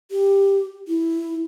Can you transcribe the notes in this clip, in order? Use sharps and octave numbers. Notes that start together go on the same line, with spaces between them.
G4
E4